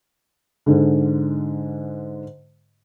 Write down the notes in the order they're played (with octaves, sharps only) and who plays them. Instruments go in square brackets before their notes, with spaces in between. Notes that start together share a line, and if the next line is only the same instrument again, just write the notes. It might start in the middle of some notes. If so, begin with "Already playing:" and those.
[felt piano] G#2 D3